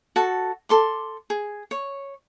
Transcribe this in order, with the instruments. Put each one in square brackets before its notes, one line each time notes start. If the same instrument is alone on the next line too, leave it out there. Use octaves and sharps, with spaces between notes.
[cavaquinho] F#4 A4 A5
A4 C6 D6
G#4
C#5